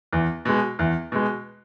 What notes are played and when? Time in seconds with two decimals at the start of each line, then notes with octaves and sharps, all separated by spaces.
0.13 E2
0.45 B2 G#3
0.79 E2
1.12 B2 G#3